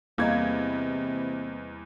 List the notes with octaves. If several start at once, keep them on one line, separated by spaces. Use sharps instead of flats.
E2 C3 G3 A#3 G#4 D#5 G#6